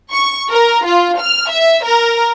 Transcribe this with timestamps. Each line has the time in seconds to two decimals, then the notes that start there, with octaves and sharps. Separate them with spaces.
0.11 C#6
0.50 A#4
0.86 F4
1.20 F6
1.51 E5
1.85 A#4